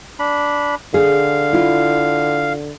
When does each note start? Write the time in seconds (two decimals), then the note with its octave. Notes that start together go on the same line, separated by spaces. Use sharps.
0.19 D4 B5
0.94 D3 G#4 F5
1.53 E4 F4